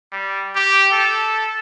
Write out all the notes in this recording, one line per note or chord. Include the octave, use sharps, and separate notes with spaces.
G3
G4
A4